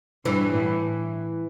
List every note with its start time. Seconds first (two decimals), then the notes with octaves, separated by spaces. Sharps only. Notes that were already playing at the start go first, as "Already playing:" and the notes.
0.25 G2 E3
0.53 A2